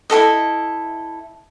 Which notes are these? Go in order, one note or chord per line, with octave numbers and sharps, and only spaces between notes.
E4 G4 A4 D#5